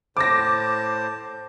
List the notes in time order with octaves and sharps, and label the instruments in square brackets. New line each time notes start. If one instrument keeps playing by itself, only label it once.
[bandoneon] A2 C5 A5 [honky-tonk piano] D6 A#6